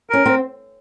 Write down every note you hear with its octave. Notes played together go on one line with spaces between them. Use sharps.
C#4 A#4
C4